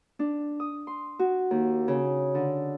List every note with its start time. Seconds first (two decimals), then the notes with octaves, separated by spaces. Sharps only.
0.19 D4
0.60 D#6
0.87 C6
1.19 F#4
1.51 D#2
1.88 C#3
2.35 D3